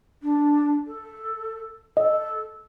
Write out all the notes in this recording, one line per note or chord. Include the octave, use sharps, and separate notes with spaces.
D4
A4
A4 D#5